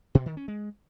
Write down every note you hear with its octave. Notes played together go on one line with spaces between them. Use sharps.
B2
D#3
C#4
G#3